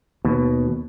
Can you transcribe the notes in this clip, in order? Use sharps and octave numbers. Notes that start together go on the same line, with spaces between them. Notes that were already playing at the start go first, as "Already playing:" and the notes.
D#2 B2